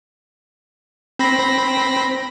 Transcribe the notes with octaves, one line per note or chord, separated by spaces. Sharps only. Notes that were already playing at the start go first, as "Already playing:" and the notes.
C4 B5 A#6